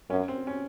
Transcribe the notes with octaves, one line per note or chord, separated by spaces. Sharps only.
F#2 C#4
C4
C#4